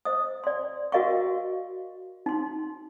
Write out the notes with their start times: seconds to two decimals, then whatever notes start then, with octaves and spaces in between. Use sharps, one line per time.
0.05 C5 D#5 D#6
0.44 D5 C6
0.92 F#4 A#4 D#5 F5 C6 C#6
2.26 D#4 C6